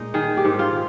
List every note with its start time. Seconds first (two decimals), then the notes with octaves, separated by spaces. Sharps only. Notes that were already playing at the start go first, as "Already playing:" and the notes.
Already playing: A#2 G#3 D#4
0.14 D#3 G#4
0.37 G4
0.45 G#2
0.59 F4